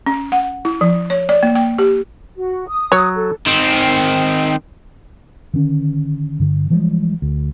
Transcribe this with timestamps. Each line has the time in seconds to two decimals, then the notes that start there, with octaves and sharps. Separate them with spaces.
0.06 C#4
0.32 F#5
0.65 E4
0.81 F3
1.10 C#5
1.29 D5
1.43 A#3
1.55 G5
1.78 G4
2.36 F#4
2.68 D#6
2.92 F#3 C#5
3.15 A4
3.46 D#3 C4
5.54 D3 D#3 C#4
6.40 G2 D3
6.70 E3 F3 G3 G#3
7.22 D2